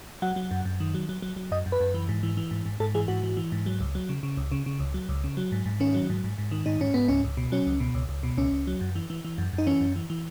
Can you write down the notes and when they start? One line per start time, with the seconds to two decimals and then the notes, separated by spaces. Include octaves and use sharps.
0.22 F#3 F#5
0.36 F#3
0.51 F#2
0.65 F#2
0.80 D#3
0.94 F#3
1.09 F#3
1.22 F#3
1.36 F#3
1.52 F#2 D#5
1.66 F#2
1.72 B4
1.81 F#2
1.94 E3
2.09 G#2
2.23 E3
2.37 E3
2.51 G#2
2.65 G#2
2.80 G#2 A4
2.94 E3 G#4
3.08 G#2 F#4
3.23 E3
3.37 E3
3.52 G#2
3.66 F#3
3.80 C#2
3.95 F#3
4.09 C#3
4.23 C#3
4.37 C#2
4.52 C#3
4.66 C#3
4.80 C#2
4.94 F#3
5.09 C#2
5.24 C#3
5.37 F#3
5.52 G#2
5.66 G#2
5.80 D#3 C#4
5.94 F#3
6.10 G#2
6.24 G#2
6.38 G#2
6.51 D#3
6.66 G#2 D#4
6.81 G#2 C#4
6.94 G#2 B3
7.08 C#2 C#4
7.24 C#2
7.37 B2
7.52 F#3 C#4
7.67 C#2
7.80 B2
7.95 C#2
8.09 C#2
8.23 B2
8.37 C#2 C#4
8.52 C#2
8.67 F#3
8.81 F#2
8.95 E3
9.10 E3
9.25 E3
9.38 F#2
9.53 F#2
9.58 D#4
9.67 E3 C#4
9.81 F#2
9.96 E3
10.10 E3